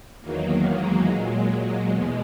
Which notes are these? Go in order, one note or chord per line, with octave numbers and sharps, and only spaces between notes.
E2 D#3 F#3 A#3
G#3
A#2 F#3 G#3
E2 B2